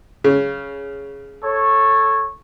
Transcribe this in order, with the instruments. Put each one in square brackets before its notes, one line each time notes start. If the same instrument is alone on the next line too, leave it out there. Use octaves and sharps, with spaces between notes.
[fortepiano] C#3
[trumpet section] A4 C#5